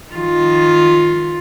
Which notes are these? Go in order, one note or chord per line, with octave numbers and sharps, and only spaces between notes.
D#3 F4